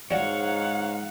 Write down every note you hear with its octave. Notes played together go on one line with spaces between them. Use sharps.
G#2 G3 D4 F#4 C#5 F5 F#5